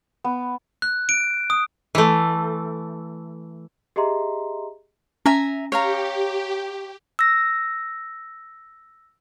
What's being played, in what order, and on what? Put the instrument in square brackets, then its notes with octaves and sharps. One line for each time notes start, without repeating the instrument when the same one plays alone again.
[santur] B3
[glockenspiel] F#6
D7
D#6
[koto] E3 A3
[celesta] G4 G#4 D#5 E5 A#5 C6
[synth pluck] C#4 [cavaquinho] E5 G#5 A#5
[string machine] G4 [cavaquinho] C#5 F5 A#5
[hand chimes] E6 A#6